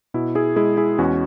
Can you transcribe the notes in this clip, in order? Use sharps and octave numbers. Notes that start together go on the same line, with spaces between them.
B2 E4
E4 G#4
G#3 E4 G#4
E4 G#4
E2 C#4 F#4